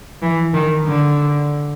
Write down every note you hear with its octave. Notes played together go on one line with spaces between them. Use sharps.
E3
D#3
D3